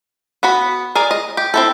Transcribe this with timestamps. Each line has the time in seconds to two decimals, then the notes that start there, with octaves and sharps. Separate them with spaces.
0.43 B3 F#4 B5
0.95 G#4 A#4 D5 G#5
1.11 D#5
1.37 G4
1.54 C4 E4 A4